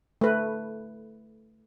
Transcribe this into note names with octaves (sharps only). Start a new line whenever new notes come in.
A3 B4